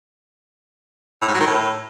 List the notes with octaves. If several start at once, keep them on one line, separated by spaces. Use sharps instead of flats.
A2
G#2
F#3
D#3
A2